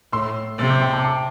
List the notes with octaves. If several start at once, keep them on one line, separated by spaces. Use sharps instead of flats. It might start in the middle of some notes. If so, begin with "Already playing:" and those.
A2 C6 E6
C3 E6 A6
D6 G6
G5 C6
A5 D6
A5 D6